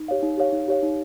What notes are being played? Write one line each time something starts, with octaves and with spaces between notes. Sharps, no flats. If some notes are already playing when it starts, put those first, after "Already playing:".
Already playing: D#4
G4 C#5 F5
D#4
G4 C#5 F5
D#4
G4 C#5 F5
D#4